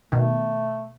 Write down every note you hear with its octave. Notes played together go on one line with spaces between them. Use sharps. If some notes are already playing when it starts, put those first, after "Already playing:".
B2 D#3 A3